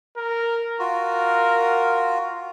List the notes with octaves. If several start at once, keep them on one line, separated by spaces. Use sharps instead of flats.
A#4
F4 F#4 A#4